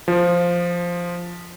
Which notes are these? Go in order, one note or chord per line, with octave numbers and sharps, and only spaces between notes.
F3